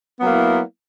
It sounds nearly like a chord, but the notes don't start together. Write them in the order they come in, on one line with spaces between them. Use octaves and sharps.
B3 F#3 A#3 E4